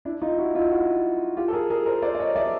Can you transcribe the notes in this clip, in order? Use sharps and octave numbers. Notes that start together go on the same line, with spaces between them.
D4 E4
D#4 F4
E4 F#4
D#4 F4
E4 F#4
F4 G4
A4
G#4 A#4
G#4 A#4
A#4 C5
C5 D5
D5
C#5 D#5
D5 E5